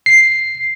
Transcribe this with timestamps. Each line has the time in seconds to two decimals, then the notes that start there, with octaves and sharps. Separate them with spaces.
0.06 C7